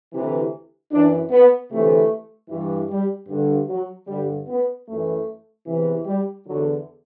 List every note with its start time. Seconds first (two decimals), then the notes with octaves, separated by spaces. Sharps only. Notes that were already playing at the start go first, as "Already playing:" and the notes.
0.12 D2 C3 E3
0.91 F#2 E3 D4
1.30 B3
1.70 D2 C3 E3 A3
2.49 G2 E3
2.89 G3
3.28 G2 D3
3.68 F#3
4.07 G2 D3 G3
4.47 B3
4.86 F#2 E3 A3
5.66 E2 C3 E3
6.05 G3
6.45 E2 D3 F#3